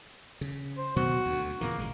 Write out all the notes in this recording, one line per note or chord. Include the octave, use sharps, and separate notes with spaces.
C#3
C5
B2 D#3 F#3 F#4
D2
A#2 C#3 E3 A#3
G#1 G#3